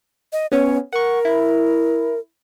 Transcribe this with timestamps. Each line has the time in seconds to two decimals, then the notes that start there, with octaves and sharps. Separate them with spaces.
0.32 D#5
0.52 B3 C#4 C#5
0.93 A#4 F#5 C#6
1.25 E4